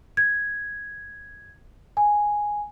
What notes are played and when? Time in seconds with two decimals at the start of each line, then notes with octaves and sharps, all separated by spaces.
0.17 G#6
1.97 G#5